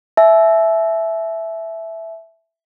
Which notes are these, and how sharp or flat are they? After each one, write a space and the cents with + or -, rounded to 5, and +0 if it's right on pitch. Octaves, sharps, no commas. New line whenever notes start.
E5 +0 A5 -45